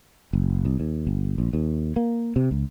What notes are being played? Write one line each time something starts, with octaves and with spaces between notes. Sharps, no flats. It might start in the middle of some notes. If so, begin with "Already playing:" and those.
F#1
C2
D#2
G1
A#1
D#2
A#3
C3
C#2